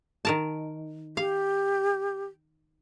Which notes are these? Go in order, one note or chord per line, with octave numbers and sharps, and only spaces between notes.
D#3 A#4 A5
G4 F5